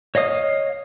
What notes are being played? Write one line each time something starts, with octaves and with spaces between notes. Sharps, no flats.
C#5 D#5 F5 D#6